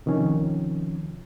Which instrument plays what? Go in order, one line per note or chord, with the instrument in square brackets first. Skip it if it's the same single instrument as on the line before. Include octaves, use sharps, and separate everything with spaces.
[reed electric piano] C3 D#3 F3 C#4